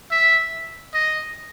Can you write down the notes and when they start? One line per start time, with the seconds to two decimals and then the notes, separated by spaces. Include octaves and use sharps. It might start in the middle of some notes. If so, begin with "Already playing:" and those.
0.11 E5
0.94 D#5